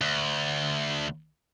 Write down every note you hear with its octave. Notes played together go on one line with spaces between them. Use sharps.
D2